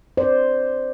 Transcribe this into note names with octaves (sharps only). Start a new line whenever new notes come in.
C5 D5